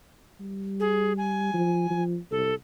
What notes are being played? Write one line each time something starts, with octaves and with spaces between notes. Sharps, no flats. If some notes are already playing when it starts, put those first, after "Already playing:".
G3
G#4
G#5
F3
F3
C2 A4